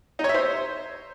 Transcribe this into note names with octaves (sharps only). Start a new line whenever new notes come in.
D#4
C#5
E5
C5